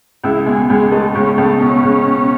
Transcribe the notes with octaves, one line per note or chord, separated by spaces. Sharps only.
C#2 E4
B2 G#3
C#2 G#3
G#3 A3
C#2 C#4
C#2 A3
B2 C#4
C#2
B2